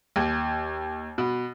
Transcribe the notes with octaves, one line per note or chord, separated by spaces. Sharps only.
D#2
B2